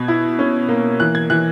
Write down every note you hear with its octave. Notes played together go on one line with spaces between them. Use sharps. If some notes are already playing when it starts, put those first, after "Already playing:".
Already playing: B2 G#6
E4
C#4
A#3
E3 F#6
G#6
E3 F#6